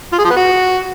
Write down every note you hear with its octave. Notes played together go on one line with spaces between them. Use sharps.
F4
G#4
F3
B3
F#4